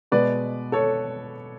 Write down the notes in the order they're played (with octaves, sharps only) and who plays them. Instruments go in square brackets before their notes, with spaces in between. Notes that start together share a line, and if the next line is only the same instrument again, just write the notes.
[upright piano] B2 G#3 B3 B4 D5
A4 C#5